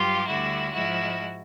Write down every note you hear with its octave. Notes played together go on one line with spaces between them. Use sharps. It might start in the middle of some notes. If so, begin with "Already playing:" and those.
Already playing: G2 F#3 F4 G4
D2 D3 G3 E4 F#4
G#2 F3 G#3 E4 F#4